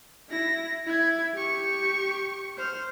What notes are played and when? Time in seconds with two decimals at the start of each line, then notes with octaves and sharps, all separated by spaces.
0.29 E4 A#6
0.87 E4 G#6
1.34 G4 C#6
2.58 C5 F6